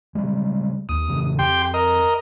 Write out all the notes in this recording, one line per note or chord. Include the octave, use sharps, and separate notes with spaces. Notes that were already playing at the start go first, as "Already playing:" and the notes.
C#3 G3 G#3
D#2 D#6
F2 C#3 E3
F2 G4 G5 C6
A#4 D#5